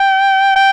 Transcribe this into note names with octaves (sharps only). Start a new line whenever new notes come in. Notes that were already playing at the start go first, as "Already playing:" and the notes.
Already playing: G5
G5